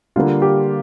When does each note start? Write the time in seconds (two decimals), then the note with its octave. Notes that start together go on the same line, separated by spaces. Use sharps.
0.16 D3 G3 A#3 F4
0.42 G4